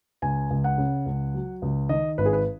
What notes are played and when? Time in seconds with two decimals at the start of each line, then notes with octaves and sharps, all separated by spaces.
0.22 C#2 G#5
0.51 C#2
0.64 F#5
0.78 C#3
1.06 C#2
1.34 F#3
1.62 C#2
1.89 D#3 D#5
2.18 G#1 B4
2.26 G#4
2.33 B4